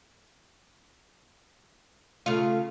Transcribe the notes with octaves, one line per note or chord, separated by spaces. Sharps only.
C#3 A3 F4